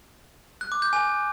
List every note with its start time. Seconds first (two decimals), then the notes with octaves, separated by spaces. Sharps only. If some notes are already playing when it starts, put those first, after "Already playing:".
0.61 F#6
0.72 D6
0.82 G6
0.93 G#5